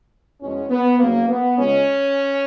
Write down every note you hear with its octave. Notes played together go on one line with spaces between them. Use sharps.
E2 B2 G#3 C#4
B3
F#1 F#2 C#3 F#3 A#3
B3
C#2 C#3 G#3 C#4